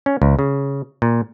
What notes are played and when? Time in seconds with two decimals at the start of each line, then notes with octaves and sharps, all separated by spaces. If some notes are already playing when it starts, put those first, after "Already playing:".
0.06 C#4
0.22 C#2
0.39 C#3
1.02 A#2